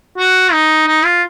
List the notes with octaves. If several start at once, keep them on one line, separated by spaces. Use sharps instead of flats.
F#4
D#4
D#4
F4